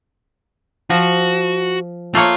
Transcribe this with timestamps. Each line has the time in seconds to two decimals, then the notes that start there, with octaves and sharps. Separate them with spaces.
0.90 F3 F#4
2.15 A3 A#3 F4 C#5